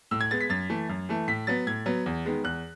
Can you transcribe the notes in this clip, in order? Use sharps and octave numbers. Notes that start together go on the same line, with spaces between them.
A2 E6
G#6
G#3 B3 A6
B6
F#2 A6
E3 A3
F#2
E3 A3
A2 B6
F#3 B3 A6
A2 G#6
F#3 B3
E2
D#3 G#3 B3
E2 F#6